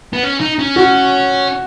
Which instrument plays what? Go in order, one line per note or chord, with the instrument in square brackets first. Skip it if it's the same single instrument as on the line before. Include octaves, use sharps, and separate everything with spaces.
[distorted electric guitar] B3
C#4
D#4
C#4
[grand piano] F#4